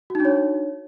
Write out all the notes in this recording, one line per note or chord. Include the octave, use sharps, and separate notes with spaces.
D4 D#4 F#4 C#5